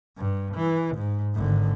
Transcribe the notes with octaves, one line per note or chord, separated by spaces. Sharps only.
G2
E3
G#2
G#1 D3